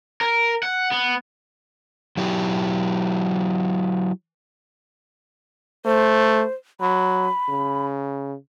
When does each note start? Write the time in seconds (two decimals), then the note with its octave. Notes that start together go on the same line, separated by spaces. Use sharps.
0.21 A#4
0.63 F#5
0.92 B3
2.17 F#3 E4 G4
5.85 A3 C5
6.81 F#3 B5
7.49 C#3